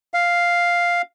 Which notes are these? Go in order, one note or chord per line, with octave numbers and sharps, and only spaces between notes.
F5